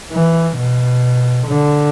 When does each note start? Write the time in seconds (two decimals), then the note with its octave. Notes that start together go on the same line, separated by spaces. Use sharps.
0.12 E3
0.58 B2
1.47 D3